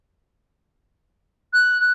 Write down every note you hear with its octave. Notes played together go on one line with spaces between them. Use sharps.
F#6